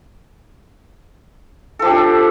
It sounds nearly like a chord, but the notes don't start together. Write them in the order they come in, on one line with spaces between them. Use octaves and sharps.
A4 F3 G4 D4